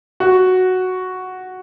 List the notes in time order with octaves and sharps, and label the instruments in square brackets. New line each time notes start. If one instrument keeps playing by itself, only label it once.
[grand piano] F#4